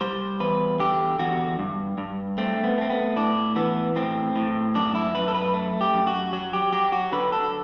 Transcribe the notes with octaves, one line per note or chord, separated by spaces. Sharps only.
G3 C5
E2 B4
D3 G4
E2 F#4
G2
G2
A3 C4
B3
A3 C4
B3
A2 D4
E3 B3
A2 C4
A2
F#2 D4
E4
F#2 B4
A4
B4
A3
G4
F#2
F#4
F#3 F#4
G4
F#3 G4
F#4
D3 B4
A4